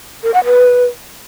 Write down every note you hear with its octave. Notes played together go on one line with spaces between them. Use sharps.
A#4
F#5
B4